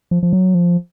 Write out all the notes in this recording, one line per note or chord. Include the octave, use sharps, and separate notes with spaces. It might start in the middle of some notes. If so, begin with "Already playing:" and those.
F3
F3
F#3
F3